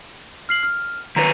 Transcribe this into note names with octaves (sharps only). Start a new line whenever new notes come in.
F6 C7 F#7
F6
D#3 F#3 B4 A#5